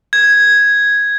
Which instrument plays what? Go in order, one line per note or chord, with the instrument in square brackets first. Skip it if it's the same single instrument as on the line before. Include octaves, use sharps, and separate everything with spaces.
[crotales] G#6